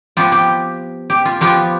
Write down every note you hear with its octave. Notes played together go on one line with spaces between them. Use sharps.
F3 B3 F4 G4
G4
G4
F4
F3 B3 F4 G4